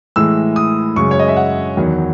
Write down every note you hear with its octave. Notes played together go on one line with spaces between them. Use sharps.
A2 E3 G#3 E6
D#6
F#2 C#3 G#3 C#6
C#5
D#5
E5
F#5
E2 D#3 F#3